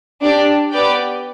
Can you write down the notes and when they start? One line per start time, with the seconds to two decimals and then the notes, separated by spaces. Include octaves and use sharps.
0.21 D4 G4 D5
0.71 B3 G4 B4 D5 G5